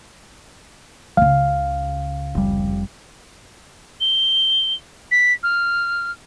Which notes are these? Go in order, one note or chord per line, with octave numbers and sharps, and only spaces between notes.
C#2 C#3 F5
F1 G3
G7
B6
F6